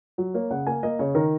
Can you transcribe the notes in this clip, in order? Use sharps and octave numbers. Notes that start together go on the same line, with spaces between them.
F#3
A#3 C#5
C#3 F#5
A#3 G#5
A#3 D#5
C#3 C#5
D#3 A#4